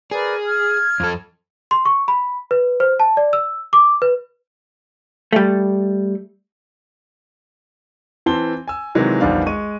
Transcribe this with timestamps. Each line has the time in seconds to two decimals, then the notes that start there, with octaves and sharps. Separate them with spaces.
0.11 G#4 A#4 B4 D5
0.47 F6 G#6
1.00 F2 A4
1.71 C6
1.85 C#6
2.08 B5
2.51 B4
2.80 C5
3.00 A5
3.17 D5
3.33 E6
3.73 D6
4.02 B4
5.33 G3 A3
8.26 E3 C4 A5 C6 G7
8.68 G#5 E6
8.95 C3 D#3 E3 F#3 G#3 A#3
9.21 A#1 E2 D#3 G3 D4 F5
9.46 G#3 C#6 D#7